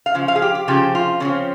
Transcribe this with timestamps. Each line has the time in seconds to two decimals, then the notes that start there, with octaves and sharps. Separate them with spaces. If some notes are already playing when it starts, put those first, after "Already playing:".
0.06 F5
0.15 C#3 F3
0.28 F5
0.36 G#4
0.42 G4
0.55 G4
0.68 C#3 F3 C4 G4
0.95 F4
1.20 C#3 F3 C4 C#4